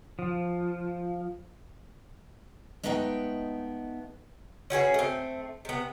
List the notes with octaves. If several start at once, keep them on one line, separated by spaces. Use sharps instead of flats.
F3
G#3 A3 B3 D#4 F5 G5
C#4 F#4 G#4 B4
A3 C4
C3 B3